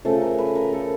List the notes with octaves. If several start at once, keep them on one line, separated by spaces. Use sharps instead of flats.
C#3 F3 A3 A4
A#4
B4
A#4
A4